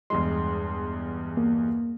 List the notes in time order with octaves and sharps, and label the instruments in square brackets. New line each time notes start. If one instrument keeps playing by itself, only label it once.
[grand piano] E2 G2 G#3 [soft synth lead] C6
[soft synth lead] A#3